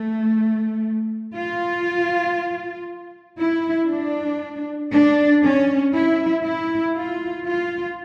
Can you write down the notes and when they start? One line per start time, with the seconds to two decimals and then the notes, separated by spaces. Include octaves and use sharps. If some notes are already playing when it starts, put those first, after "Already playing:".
Already playing: A3
1.34 F4
3.38 E4
3.88 D4
4.91 D4
5.43 C#4
5.93 E4
6.44 E4
6.95 F4
7.47 F4